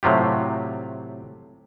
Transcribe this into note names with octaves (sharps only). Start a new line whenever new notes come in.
A2 C3 F#3 F4 G4